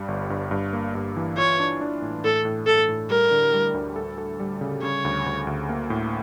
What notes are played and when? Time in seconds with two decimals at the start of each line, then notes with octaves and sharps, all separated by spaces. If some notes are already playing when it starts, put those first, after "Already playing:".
Already playing: G2 G3
0.08 G1
0.30 G2
0.51 G2
0.73 A#3
0.95 G2
1.16 E3
1.38 F4 C#5
1.60 D4
1.81 D4
2.02 A2
2.24 A2 A4
2.45 A2
2.67 A2 A4
2.89 A2
3.10 G3 A#4
3.31 D3
3.53 G3
3.74 D2
3.96 A4
4.18 A4
4.40 G3
4.61 C#3
4.83 C#3 C#5
5.05 D2
5.26 D2
5.47 D2
5.69 A#3
5.90 A2